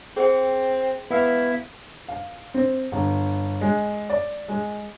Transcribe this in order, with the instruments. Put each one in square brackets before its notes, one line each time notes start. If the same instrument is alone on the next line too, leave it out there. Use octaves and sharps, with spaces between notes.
[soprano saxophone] C4 [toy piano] G#4 C5 G5
[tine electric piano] B3 E5 F5 [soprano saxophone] E4
[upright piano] F5
C4
G1
G#3
D5
G#3